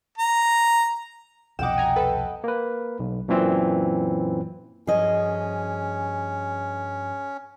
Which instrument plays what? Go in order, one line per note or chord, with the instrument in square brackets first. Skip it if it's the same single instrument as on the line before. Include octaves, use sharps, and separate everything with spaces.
[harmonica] A#5
[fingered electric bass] C2 F2 B2 [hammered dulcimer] D#5 F#5 G5 [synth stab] D6 E7
[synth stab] G#5 A#5
A4 B4
[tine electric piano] A#3 B4
B1
F#2 A#2 E3 C4
[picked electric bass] G2 F3 [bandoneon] C#4 [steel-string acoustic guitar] G#4 D#5